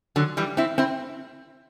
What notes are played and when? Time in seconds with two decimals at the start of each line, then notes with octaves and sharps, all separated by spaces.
0.16 D3 F#3
0.37 E3 G3
0.57 C4 E4
0.78 C4 E4